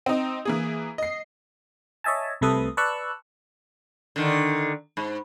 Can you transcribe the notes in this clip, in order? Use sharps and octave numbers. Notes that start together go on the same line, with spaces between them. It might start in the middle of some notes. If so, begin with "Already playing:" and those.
C4 D#4
E3 A#3 G#4
D#5 C7
C#5 D#5 E5 G#5 A5
C2 C3 A3 A4 B4 D#6
B4 D5 A5 C#6 E6 F#6
D3 D#3
G#2